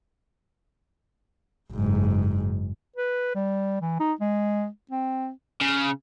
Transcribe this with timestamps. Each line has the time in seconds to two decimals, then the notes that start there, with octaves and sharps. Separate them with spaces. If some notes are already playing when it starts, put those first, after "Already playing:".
1.72 F#1 G#2
2.96 B4
3.35 G3
3.81 E3
4.00 D#4
4.20 G#3
4.91 C4
5.61 C#3